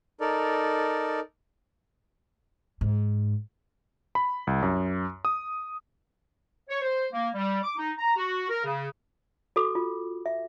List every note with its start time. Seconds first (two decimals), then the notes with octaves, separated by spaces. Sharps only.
0.20 D#4 A4 A#4 D5
2.81 G#2
4.15 B5
4.47 C2
4.63 F#2
5.25 D#6
6.69 C#5
6.82 C5
7.13 A#3
7.34 G3
7.63 D6
7.77 D#4
7.98 A#5
8.17 F#4
8.49 A#4
8.64 C#3
9.56 F#4 A4 D6
9.75 F4
10.26 E5